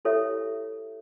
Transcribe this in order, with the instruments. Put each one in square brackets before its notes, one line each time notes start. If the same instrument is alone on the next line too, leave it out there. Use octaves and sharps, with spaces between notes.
[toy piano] E4 G4 A4 C#5 E5